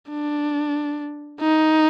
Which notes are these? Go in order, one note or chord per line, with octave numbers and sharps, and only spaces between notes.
D4
D#4